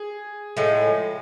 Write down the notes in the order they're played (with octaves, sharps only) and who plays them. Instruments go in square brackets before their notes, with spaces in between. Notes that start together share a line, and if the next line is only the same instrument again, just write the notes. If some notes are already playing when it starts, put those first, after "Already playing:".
Already playing: [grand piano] G#4
[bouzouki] A2 F3 G#3